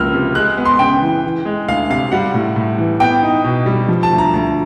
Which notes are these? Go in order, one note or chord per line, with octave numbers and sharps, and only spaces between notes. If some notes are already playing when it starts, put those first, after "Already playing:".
Already playing: C#2 F3 A#3 E6 F6
C3
G#3 F#6
B3
C6
C#3 G5
E3
E3
G#3
D2 F5
C3 F5
G3 F#5
A2
A2
E3
B3 G5
D#4
B2
G3
F3
A5
D2
A#5
D2